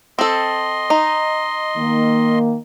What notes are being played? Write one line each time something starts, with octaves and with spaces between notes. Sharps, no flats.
C4 A4 D#5 C6
D#4
D#3 A#3